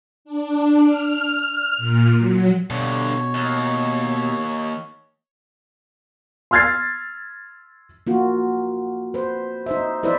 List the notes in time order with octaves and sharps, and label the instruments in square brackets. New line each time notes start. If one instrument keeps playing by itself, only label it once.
[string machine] D4
F6
A#2
F#3
[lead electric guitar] G2 D3 [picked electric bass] B2 [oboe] C#5
[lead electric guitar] D#2
[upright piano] C6 E6 F6 G#6 A6 C7
[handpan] A#3 F4 F#4
B4 C5
D#4 C5 E5
E4 B4 C5 D5 E5